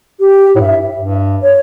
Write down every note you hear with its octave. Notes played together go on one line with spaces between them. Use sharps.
G4
A2
G2 E5
G2
C#5